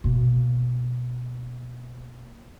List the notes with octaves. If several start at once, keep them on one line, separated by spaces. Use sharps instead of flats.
B2 A#3